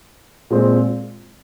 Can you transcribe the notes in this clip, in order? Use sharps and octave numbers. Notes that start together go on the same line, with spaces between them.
A#2 G#3 C4